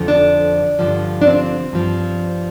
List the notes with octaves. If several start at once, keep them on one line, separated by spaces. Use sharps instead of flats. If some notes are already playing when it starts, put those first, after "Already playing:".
Already playing: F2 D3 F3
D4
G2 D3 F3
D4
C4
G2 F3